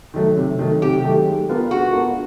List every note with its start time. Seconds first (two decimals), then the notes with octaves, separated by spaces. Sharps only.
0.14 D#3 F#3 A3
0.37 C3
0.59 D#3 F#3 A3
0.82 C3 G4
1.04 D#3 F#3 A3
1.26 G#3
1.49 B3 D4 F4 A#4
1.71 G#3 F#4
1.93 B3 D4 F4 A#4